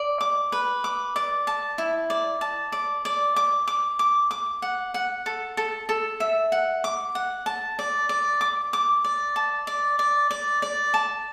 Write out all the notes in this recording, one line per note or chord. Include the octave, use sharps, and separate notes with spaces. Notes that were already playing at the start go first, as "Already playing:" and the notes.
Already playing: D5
D6
B4
D6
D5
A5
E4
D5
A5
D5
D5
D6
D6
D6
D6
F#5
F#5
A4
A4
A4
E5
F#5
D6
F#5
A5
D5
D5
D6
D6
D5
A5
D5
D5
D5
D5
A5